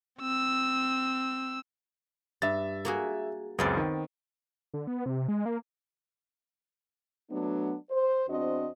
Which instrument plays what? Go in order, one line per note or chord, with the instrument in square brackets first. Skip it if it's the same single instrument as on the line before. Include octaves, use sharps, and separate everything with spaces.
[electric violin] C4 E6
[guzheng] G2 [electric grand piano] E5 A6
[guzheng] A#3 F#4 G#4
[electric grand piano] C#2 F#2 G#4 [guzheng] B3 C4 D5
[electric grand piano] D#3
[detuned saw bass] D3
B3
C3
G#3
A#3
[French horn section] F#3 A3 B3 D4
C5
E2 C4 D4 F#4 C5 D#5